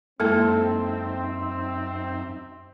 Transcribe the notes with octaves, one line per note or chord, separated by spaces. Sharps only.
F#2 G#3 A#3 C4 D#4 E4 A4 E5